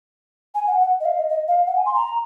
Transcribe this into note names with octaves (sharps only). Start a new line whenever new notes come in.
G#5
F#5
F#5
D#5
F5
D#5
D#5
F5
F#5
G#5
C6
A#5